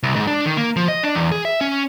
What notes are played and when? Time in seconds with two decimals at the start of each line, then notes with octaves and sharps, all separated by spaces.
0.03 C2
0.16 G#2
0.27 D4
0.46 D#3
0.57 A#3
0.76 F3
0.88 D#5
1.03 D4
1.15 E2
1.32 G#4
1.45 E5
1.61 C#4